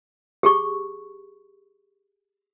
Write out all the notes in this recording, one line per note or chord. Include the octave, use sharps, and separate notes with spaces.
G4 G#4 C#6